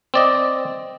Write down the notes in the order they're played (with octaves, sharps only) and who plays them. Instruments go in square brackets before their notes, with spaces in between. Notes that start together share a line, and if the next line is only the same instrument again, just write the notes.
[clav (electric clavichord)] C4 D5 D#5